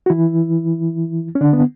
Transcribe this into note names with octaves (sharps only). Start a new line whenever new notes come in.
F#4
E3 E4
C#4
D3 D4
B3